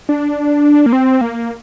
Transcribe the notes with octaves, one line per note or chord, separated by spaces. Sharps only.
D4
A#3
C4
A#3